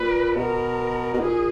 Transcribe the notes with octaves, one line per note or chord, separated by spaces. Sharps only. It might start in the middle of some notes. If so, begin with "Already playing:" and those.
Already playing: A#2 B4
B2 A#4
B2
A#2 G#4